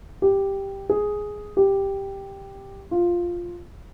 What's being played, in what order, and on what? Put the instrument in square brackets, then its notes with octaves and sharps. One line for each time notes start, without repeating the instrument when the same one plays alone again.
[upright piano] G4
G#4
G4
F4